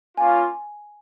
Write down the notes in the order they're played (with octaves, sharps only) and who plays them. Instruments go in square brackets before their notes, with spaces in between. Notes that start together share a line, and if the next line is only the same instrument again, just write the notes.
[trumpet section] A#3 C#4 F4 [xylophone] G#5